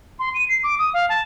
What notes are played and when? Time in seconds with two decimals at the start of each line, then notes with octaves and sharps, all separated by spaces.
0.19 C6
0.34 D#7
0.49 C7
0.63 D6
0.79 D#6
0.94 F5
1.09 A5